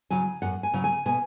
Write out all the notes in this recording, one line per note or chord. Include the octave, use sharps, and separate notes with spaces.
C#3 F#3 G#5
F#2 F#5
G#5
C#3 F#3
G#5
B2 G#5